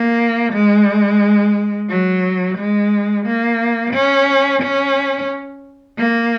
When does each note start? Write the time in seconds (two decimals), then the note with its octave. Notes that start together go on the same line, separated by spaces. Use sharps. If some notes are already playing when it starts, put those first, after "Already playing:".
Already playing: A#3
0.53 G#3
1.89 F#3
2.58 G#3
3.26 A#3
3.94 C#4
4.62 C#4
5.98 A#3